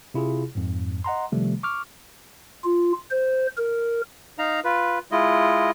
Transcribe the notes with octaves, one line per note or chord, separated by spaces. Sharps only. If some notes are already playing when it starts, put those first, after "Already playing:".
C3 E4 F4 G#4
F2 G#2
D#5 F#5 A#5 C6
C3 D#3 F3 G3 A3
C#6 D6 F6
F4
C5
A#4
D#4 F5 A#5
F4 B4
G#3 E4 F4 D#5